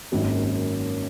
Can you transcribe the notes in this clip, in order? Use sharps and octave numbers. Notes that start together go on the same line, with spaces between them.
G#1 F#2 D#3 F#3 A#3